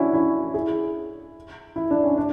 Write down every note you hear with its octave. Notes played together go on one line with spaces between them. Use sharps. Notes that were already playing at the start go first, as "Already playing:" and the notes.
Already playing: C#4 D4 E4 F#4
C#4 E4
E4 G#4
E4
D4
C#4
D4